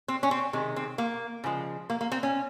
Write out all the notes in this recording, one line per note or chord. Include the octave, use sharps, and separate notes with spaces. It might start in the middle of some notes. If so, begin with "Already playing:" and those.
C4
C#4
C4
C3 D#3 G#3
C4
A#3
C#3 F3 G#3
A#3
A#3
C4
C#4